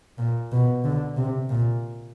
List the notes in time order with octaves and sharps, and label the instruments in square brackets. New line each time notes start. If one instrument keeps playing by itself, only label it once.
[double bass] A#2
B2
D3
C3
A#2